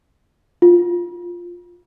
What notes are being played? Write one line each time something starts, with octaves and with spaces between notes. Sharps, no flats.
F4